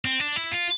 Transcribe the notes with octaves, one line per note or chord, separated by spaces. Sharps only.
C4
D4
E4
F4